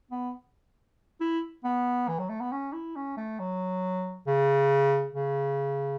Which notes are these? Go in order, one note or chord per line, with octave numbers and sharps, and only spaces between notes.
B3
E4
B3
E3
F#3
A3
B3
C#4
E4
C#4
A3
F#3
C#3
C#3